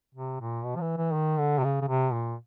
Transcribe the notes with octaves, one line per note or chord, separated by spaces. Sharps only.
C3
A#2
B2
F3
E3
E3
D#3
D3
C3
C#3
C#3
C3
A#2